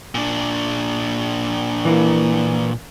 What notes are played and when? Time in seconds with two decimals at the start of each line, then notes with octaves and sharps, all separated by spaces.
0.15 A#2 D4
1.85 E3 A#3